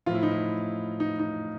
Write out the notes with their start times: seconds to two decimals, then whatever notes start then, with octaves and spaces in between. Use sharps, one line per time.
0.06 A2 F3 F4
0.15 E4
0.23 D#4
0.31 E4
1.00 D#4
1.19 D#4